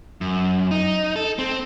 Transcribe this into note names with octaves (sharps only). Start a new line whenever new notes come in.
F#2
D#4
A4
C4